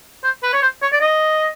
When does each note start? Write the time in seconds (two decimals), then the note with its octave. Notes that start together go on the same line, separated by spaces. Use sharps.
0.23 C5
0.43 B4
0.53 C#5
0.62 C5
0.82 C#5
0.92 D5
1.01 D#5